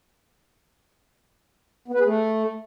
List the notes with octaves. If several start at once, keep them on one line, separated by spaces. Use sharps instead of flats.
B3
B4
G#4
A3